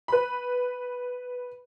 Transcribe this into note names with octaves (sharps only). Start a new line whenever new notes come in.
B4 B5